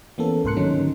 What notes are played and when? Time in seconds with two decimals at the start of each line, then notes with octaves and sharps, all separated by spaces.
0.18 E3 A#3 B3 C#4 A4
0.44 C2 G#2 A#4 C6 F#6 C#7
0.57 D3 D#3 F#3 C#4 D#4